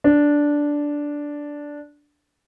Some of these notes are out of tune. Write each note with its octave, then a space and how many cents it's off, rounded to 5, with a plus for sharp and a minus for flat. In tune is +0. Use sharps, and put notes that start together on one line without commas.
D4 -5